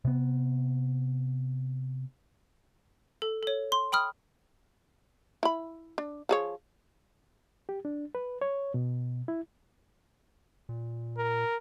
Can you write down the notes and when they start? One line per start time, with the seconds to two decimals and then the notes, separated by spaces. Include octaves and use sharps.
0.05 C3 B3
3.22 A4
3.43 A4 C#5
3.72 C6
3.92 G5 B5 D#6 F6
5.43 E4 B5
5.98 D4
6.29 F3 G#4 C#5
7.69 G4
7.85 D4
8.15 B4
8.41 C#5
8.74 B2
9.28 E4
10.69 A#2
11.18 A#4